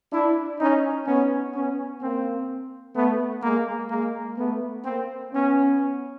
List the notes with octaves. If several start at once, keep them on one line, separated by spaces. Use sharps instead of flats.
D4 E4
C#4 D#4
B3 C#4
B3 C#4
A#3 C4
A3 B3
G#3 A#3
G#3 A#3
A3 B3
A#3 C4
B3 C#4